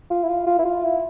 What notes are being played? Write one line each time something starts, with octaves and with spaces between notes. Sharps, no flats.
F4
E4
F4
F4
E4
F4
E4